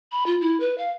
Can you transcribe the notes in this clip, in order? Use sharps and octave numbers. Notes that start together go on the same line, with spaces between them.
B5
F4
E4
B4
F5